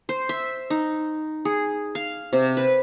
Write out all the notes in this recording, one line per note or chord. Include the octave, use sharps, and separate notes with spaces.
C5
E5
D#4
G#4
F5
C3
B4